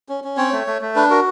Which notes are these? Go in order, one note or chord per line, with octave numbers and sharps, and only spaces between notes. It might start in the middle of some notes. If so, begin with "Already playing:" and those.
C#4
C#4
C4 C#5
A3
A3
A3
D4 B4
F#4 A#4